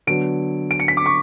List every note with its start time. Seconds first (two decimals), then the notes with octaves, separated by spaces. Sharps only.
0.07 D3 F#3 B3 D7
0.71 D7
0.80 C#7
0.88 B6
0.97 D6
1.06 C#6